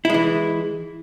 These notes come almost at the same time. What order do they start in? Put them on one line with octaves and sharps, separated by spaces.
E4 G#3 E3